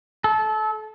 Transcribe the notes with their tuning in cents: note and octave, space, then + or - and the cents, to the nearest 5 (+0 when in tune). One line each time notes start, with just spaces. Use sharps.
A4 -25